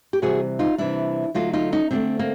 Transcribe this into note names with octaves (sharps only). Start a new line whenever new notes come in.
G4
C3 E3 G3 F#4 G#4
D#4 F4
C3 E3 G3 D4 E4
D3 F#3 A3 D#4 F4
D#4 F4
C#4 D#4
D3 F#3 A3 C4 D4
A#3 C4